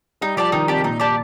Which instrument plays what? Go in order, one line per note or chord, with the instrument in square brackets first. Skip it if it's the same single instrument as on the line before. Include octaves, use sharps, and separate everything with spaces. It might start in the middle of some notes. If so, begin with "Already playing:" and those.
[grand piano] G3 [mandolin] D#4
[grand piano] F3 [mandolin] G4 D5 A5
[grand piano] D#3 [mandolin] D#4
[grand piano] C3 [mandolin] G4 D5 A5
[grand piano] A#2 [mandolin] D#4
[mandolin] G4 D5 A5